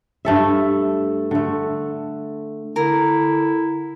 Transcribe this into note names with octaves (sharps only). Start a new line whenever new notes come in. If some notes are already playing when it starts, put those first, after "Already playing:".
G2 A3 A4 E5
D3 A3
D3 E4 A#4